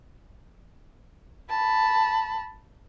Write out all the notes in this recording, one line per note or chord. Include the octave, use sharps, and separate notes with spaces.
A5 B5